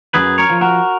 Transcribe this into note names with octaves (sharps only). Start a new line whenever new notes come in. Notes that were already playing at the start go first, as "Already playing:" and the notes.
F#2 G#4 B4
A#4 C#5
F3
F#4 A#4